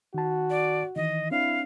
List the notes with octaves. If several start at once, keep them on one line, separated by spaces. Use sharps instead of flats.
D#3 F#4 A5
D5
D#3 E3 D#5
C4 D4 E4 F5